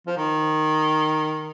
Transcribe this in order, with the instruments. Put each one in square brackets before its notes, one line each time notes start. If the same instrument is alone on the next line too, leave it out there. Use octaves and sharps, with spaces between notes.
[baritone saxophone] F3
D#3